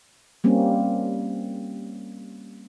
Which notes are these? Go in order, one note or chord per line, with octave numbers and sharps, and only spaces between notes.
G3 A#3 C4 C#4